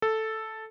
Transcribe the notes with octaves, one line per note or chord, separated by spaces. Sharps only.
A4